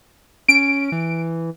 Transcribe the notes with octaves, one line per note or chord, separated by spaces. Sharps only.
C#4 D7
E3